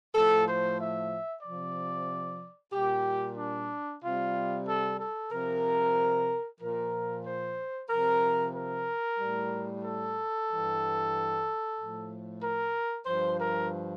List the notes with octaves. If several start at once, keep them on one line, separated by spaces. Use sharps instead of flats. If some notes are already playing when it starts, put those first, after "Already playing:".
A2 F3 A4
C5
E5
C3 F3 D5
A#2 G3 G4
D4
C3 G3 F4
A4
A4
C3 F3 A#4
A#2 F3 A#4
C5
C3 F3 A#4
A#4
A2 G3
A4
G2 E3 G3
A2 F3
A#4
G2 F3 C5
A#4